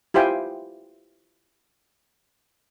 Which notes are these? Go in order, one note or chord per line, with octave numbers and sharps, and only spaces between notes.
E4 F4 G4 C5 G5 G#5